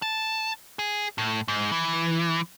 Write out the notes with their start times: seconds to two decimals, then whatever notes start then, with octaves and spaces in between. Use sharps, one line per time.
0.02 A5
0.79 G#4
1.18 A2
1.48 G#2
1.72 E3